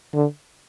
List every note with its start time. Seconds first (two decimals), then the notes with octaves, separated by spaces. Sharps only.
0.14 D3